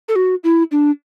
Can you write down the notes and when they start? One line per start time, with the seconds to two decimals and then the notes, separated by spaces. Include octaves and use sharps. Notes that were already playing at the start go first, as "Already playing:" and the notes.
0.08 A4
0.16 F#4
0.44 E4
0.71 D4